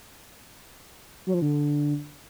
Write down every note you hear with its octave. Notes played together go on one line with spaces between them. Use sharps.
F#3
F3
D3